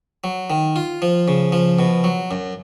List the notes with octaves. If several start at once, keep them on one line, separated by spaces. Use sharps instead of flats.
F#3
D#3
F4
F3
C#3
F3
B2
F#3
F#2